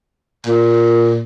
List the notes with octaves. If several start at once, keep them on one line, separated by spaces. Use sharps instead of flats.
A#2